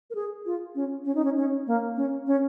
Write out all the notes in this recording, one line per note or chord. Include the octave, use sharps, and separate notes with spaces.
A#4
G#4
F4
C#4
C#4
D#4
C#4
C#4
A#3
C#4
C#4